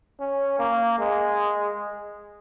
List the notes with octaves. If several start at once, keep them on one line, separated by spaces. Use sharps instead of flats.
C#4
A#3
G#3